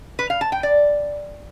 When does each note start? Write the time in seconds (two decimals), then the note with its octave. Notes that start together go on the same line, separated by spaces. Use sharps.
0.19 B4
0.30 F5
0.41 A5
0.52 G5
0.63 D5